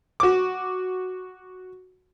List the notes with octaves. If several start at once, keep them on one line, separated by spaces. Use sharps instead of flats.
F#4 D6